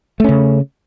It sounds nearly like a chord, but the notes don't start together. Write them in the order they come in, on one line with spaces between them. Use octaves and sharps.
A3 C#4 C#3